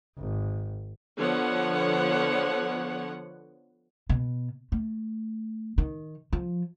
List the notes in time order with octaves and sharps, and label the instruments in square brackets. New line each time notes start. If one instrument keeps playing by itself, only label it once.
[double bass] G#1
[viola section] D3 F3 B3 C#5 F#5
[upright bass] B2
A3
D#3
F3